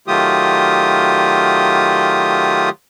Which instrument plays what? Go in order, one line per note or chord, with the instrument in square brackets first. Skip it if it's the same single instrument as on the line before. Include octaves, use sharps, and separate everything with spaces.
[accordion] D#3 F#3 A3 F4 G4 D#6